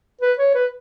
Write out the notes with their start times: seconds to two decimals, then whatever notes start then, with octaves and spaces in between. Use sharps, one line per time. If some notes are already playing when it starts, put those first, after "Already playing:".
0.21 B4
0.38 C#5
0.54 B4